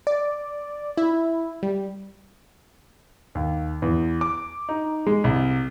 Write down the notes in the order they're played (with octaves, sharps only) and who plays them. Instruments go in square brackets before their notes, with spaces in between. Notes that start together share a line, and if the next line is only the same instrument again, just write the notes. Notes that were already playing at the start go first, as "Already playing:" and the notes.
[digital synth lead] D5
E4
G3
[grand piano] D#2
E2
D6
D#4
G#3
C2